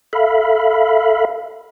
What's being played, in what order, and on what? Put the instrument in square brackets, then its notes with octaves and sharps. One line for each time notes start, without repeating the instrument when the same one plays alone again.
[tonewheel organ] A4 E5 F5 B5